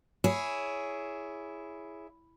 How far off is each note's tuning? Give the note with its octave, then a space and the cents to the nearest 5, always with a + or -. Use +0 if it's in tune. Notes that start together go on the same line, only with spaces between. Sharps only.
E4 +0 G#4 +0 C#5 +15